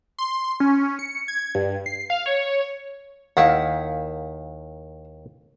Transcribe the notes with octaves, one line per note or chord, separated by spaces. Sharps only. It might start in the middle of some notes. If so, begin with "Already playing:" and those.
C6
C#4
C#7
G#6
G2
C7
F5
C#5
D#2 D#3 E4 A#4 F5 F#5